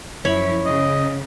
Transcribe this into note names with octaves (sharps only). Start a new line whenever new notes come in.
F#2 F3 E4 C#5 B5
C#3 D#5